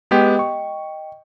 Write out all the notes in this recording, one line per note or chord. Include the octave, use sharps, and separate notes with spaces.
G#3 B3 G4 D#5 G5
C#6